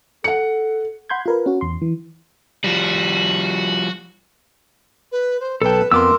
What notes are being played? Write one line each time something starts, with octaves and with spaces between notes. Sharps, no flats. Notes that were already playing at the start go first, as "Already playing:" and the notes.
A4 F#5 C#7
F#5 B5 C6 G6 G#6
F4 A#4 B4
C#4 F#4
E2 C6
E3
F3 G3 F#4
B4
C5
B1 A4 B4 G5 A5
F2 B3 A#4 C6 D6 E6